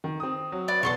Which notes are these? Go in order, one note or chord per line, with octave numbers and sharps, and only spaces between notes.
D#3
C4 D#6
F#3
B4 D5
E1 B3 A4 C6 C#6